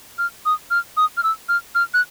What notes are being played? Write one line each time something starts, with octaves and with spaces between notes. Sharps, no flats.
F6
D#6
F6
D#6
F6
E6
F6
F6
F#6